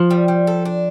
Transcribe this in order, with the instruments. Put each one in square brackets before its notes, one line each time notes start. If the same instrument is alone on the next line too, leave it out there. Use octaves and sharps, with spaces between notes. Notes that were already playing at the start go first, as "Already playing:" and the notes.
Already playing: [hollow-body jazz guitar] F3
[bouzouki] G3
G3
A4
D4